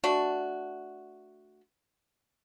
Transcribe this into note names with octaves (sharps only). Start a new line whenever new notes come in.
A3 D4 F#4